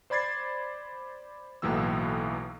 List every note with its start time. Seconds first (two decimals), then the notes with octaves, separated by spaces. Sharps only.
0.10 C5 D5 B5 G#6 A6 C7
1.62 B1 A2 E3 F#3 A#3 E6